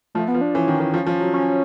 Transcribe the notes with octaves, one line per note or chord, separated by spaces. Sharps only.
F3 A3
B3
F3
D4
E3 C#4
D#3
E3
F3
F3
F#3
C#4